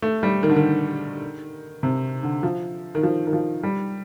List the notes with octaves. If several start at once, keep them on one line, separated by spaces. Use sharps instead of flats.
A3
G3
D#3
D3
D#3
C3
D3
F3
D#3
F3
D#3
F3
G3